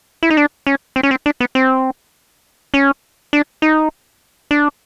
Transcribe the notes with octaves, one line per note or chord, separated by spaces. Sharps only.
E4
D#4
D4
C#4
C4
C#4
C4
D4
B3
C4
C#4
D4
D#4
D4